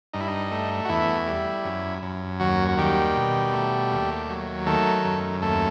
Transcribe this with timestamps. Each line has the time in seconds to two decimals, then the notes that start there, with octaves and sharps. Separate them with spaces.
0.13 G2 D#4
0.20 E4
0.28 D#4
0.51 A3
0.85 F#4
0.89 E2 E4
1.27 G3
1.65 F#2
2.03 F#2
2.39 D#2 F#3 F#4
2.68 F#4
2.78 D#3 G3 G4
3.15 B2
3.53 A3
3.92 D#2
4.29 F#3
4.66 D#3 A3 A4
5.05 F#2
5.42 D#2 A3 A4